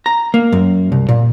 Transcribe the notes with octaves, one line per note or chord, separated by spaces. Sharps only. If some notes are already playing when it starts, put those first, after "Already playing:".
A#5
A#3
F#2
C2
A#2